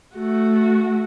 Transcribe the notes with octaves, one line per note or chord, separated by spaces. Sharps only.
A3 F#4